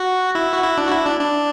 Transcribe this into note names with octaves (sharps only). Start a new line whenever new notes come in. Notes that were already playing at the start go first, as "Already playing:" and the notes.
Already playing: F#4
E4
F#4
E4
D4
F#4
E4
D4
D4